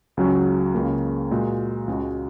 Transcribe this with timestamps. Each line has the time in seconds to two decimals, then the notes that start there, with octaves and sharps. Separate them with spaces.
0.17 C#2 C#3 F#3 C#4 F#4
0.74 C#2 C#3 A#3
1.31 A#2 G#3 F#4
1.88 C#2 C#3 G#3 F#4